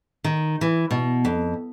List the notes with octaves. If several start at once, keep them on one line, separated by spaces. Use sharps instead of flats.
D#3
E3
B2
F2